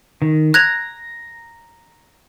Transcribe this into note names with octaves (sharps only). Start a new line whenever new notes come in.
D#3
A#5 F#6 G#6 F7